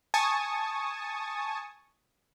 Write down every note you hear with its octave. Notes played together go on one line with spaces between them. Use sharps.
G#5 A5 C#6 D#6